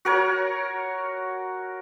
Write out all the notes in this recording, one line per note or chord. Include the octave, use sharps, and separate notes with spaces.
F#4 A#4 C#5